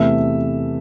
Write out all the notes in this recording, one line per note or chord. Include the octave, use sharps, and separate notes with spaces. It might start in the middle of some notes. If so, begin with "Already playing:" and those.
Already playing: E2 C3 E3 A3 E5